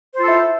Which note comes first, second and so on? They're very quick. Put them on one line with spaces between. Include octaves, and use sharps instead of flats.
C5 F4 A4 E4